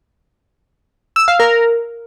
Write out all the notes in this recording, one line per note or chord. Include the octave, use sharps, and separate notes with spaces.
E6
F5
A#4